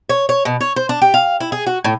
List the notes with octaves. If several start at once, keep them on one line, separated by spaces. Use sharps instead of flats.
C#5
C#5
B2
C#5
C5
D4
G4
F5
E4
G#4
F#4
A2